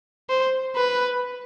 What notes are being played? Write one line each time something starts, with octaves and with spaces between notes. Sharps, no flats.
C5
B4